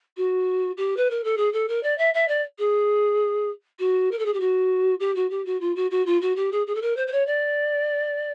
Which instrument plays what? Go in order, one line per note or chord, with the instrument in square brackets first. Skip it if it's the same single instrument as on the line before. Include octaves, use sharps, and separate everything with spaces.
[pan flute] F#4
G4
B4
A#4
A4
G#4
A4
A#4
D5
E5
E5
D5
G#4
F#4
A#4
A4
G#4
G4
F#4
G4
F#4
G4
F#4
F4
F#4
F#4
F4
F#4
G4
G#4
G#4
A4
A#4
C5
C5
C#5
D5